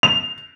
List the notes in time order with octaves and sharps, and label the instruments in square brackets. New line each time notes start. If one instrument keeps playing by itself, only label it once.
[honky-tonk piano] F7